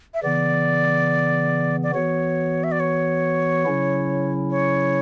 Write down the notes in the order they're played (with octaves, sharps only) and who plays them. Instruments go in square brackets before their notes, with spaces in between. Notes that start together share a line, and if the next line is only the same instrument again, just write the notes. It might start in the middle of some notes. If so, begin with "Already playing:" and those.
[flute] E5
[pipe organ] C#3 E3 B3 [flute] D5
[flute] D5
[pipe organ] E3 B3 F#4 [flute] C#5
[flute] E5
D5
C#5
[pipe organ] C#3 F#3 C#4 E4
[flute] C#5